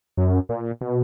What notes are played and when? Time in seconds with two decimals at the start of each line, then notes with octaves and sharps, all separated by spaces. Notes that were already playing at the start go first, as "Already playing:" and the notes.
0.17 F#2
0.49 A#2
0.81 B2